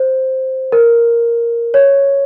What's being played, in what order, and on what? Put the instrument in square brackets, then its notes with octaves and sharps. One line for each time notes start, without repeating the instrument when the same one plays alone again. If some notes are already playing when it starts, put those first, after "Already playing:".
Already playing: [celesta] C5
A#4
C#5